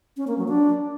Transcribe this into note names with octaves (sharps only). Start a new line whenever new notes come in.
C#4
A#3
F#3
D4